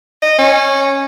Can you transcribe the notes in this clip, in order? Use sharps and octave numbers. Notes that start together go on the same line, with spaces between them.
D#5
C#4